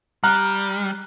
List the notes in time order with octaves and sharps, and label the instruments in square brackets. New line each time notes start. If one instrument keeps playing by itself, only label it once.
[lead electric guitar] G3 [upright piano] A#5 F#6 [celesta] F6